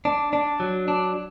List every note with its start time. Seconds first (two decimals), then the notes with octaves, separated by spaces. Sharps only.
0.05 D4
0.33 D4
0.60 F#3
0.88 D4